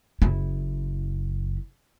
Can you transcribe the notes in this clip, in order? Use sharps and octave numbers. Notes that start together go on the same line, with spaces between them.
F#1 E4